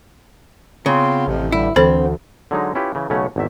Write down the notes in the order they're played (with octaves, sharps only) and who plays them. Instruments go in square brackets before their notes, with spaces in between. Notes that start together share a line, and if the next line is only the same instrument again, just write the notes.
[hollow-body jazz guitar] C#3 [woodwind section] B3 C4 F4
[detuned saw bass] A1 [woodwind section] F2 C3 F3
[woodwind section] G2 D3 G3 [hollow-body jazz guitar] E4
[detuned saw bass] D2 [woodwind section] D3 [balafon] E3 A4 C5 [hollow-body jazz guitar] C4
[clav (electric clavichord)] D3 F#3 G#3 D#4
C#4 E4 F4 G4 B4
C#3 E3
B1 C#3 A3 C#4 C#5 F#5
G#1 E2 E5